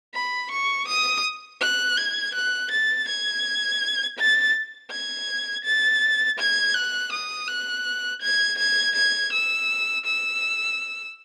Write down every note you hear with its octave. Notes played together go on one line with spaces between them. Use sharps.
B5
C#6
D#6
F#6
G#6
F#6
A6
G#6
A6
G#6
A6
G#6
F#6
D#6
F#6
G#6
G#6
G#6
E6
E6